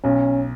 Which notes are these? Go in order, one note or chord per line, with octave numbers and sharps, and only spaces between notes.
B1 C#4